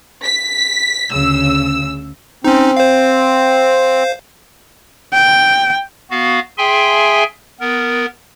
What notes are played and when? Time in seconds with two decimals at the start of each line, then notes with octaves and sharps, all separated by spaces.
0.23 B6
1.11 D2 C#3 E6
2.44 C4 C#4 D#4
2.77 C5 F5
5.13 G5
6.11 B3 F#4 F5
6.58 G#4 E5 G5 G#5 C6
7.60 B3 A#4